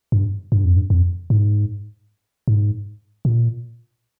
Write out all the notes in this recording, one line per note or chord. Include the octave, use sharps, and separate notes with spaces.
G2
G2
F2
G2
F2
G#2
G#2
A#2